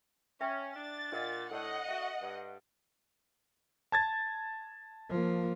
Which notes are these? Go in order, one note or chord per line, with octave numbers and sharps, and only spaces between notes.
C#4 E5 G5
D4 A6
A#2 D4 D#5 F#5
A2 A4 D5 D#5 F#5
F#4 E5
G2
A5 G#6 A6
F3 A#3